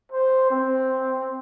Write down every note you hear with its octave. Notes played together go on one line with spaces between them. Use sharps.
C5
C4